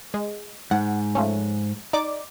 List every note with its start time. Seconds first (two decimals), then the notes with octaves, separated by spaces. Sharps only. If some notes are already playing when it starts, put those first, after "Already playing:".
0.14 G#3
0.71 G#2 F#5
1.15 F3 A3 C#4
1.93 D#4 D5 D6